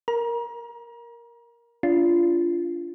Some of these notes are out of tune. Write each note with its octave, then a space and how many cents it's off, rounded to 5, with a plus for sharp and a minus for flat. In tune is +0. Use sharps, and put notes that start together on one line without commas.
A#4 +5 A#5 +35
D4 -35 F4 -25